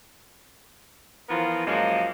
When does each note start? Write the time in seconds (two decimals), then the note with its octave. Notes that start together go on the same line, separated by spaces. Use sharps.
1.30 E3 F3 B3 F4 A#4
1.66 F#2 F3 G#3 A#3